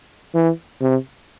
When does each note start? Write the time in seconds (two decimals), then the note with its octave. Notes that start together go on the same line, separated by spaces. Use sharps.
0.35 E3
0.81 C3